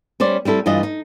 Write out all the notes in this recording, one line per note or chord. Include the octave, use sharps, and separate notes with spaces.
G3 C#4 C5 D5
G3 C4 E4 A4
G2 E3 G3 F4 D#5
D#4